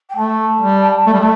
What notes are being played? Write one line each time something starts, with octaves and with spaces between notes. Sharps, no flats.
G5
A3 A5
G3
A3
G3
A3